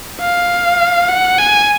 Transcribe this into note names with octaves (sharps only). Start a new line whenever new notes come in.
F5
F#5
G#5